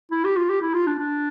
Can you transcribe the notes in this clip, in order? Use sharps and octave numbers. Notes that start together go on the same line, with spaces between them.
E4
G4
F4
G4
E4
F4
D4
D4